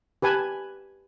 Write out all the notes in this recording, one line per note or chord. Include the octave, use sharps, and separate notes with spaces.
G4 B4 G#5 A5